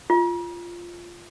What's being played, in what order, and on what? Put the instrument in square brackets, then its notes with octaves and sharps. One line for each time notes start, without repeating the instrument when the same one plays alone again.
[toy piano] F4